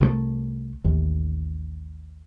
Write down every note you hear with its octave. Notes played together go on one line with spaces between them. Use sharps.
C2 F#3 A3
A1 D#2